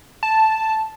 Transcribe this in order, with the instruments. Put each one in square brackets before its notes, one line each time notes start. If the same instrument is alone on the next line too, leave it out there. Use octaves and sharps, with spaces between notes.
[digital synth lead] A5